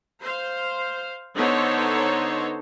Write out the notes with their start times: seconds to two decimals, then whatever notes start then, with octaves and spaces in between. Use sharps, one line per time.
0.21 C5 F5
1.35 D3 B3 D#4 A4 C5 C#5